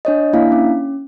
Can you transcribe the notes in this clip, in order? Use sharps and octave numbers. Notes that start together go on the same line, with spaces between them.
D4 C#5 D#5
A#3 D4 E4 F5
C#4